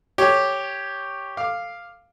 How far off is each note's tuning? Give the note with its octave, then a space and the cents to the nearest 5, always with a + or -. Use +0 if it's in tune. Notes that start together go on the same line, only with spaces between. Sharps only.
G4 +0 C#5 +0
F5 +0 D6 +10